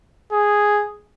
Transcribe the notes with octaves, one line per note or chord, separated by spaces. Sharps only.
G#4